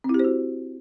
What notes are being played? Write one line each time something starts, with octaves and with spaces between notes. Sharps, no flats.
C4
E4
G4
C5
F#4